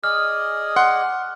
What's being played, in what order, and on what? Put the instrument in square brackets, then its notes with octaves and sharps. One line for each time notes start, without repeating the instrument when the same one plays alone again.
[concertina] G#4 D5 D#5 [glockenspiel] F6
[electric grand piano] F#5 C6